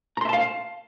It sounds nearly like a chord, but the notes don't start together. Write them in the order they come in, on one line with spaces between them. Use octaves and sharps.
A#5 C6 E5 A5 F5